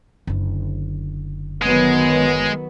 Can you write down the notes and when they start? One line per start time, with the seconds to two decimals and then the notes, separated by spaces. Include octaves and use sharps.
0.27 F#1 D3
1.62 D#3 F#3 G#3 B3